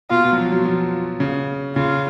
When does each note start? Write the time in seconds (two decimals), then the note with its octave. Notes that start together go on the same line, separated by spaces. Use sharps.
0.10 B2 F4
0.25 B2
0.32 F#3
0.38 F3
0.52 F#3
0.65 F3
1.20 C#3
1.76 C#3 F4